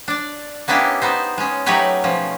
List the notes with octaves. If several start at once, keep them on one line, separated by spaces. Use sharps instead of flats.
D4 D5
A#3 B3 C#4 D4 E4 G4
B3 D#4 C5
G#3 C#4
F#3 A3 D#4 G4 B4 C#5
B2 F3 C#4